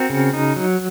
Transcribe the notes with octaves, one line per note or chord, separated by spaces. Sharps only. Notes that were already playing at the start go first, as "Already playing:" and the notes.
Already playing: C4 F#4 A#4
C#3
D#4
F#3